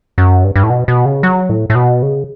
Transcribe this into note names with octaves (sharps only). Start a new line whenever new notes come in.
F#2
G2
G2
A2
B2
B2
C#3
F#3
A2
A2
B2
C#3